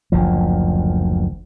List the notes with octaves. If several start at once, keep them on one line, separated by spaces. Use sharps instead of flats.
F#1 D2 F3